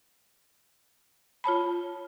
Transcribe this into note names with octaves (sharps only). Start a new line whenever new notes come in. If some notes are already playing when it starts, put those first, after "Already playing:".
F4 C#5 A5 B5